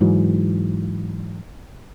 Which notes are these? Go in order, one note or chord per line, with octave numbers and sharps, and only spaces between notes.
G#2 E3 F#3